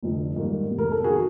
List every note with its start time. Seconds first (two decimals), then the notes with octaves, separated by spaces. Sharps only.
0.03 F1 F2 D3
0.36 G#2 D#3 G3 A#3
0.70 F1 E2 C3
0.78 A#4
0.91 A4
1.04 D#3 F#3 F#4 G#4